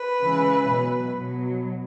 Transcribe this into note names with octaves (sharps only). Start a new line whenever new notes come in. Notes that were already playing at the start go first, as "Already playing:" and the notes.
Already playing: B4
C#3 E3 G#3
B2 F#3
B2 F#3